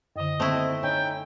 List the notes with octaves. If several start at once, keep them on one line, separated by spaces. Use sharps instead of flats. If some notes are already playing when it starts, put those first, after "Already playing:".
F#2 D3 D#5
D#2 A3 C4 E4
C#4 D#4 G5